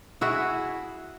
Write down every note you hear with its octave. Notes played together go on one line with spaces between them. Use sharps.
E4 F#4 G#4 E5